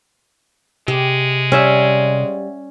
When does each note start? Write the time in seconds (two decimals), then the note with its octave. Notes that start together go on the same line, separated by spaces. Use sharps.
0.88 C3 G#3 G4
1.52 G3 C#4 E5 F#5